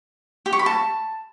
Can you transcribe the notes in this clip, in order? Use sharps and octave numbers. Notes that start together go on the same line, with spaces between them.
G4
C#6
B5
A5